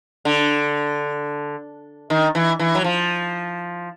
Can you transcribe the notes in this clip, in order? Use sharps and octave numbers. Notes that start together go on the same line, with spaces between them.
D3
D#3
E3
E3
F#3
F3